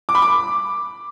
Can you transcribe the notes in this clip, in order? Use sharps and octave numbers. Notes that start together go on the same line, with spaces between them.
D6
B5
D6